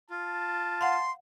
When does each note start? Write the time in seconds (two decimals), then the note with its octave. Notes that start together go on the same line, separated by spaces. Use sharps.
0.10 F4 A5
0.81 F5 F#5 C6